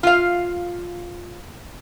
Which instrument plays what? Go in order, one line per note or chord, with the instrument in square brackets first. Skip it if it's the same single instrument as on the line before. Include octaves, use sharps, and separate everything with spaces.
[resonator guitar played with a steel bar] F4 F5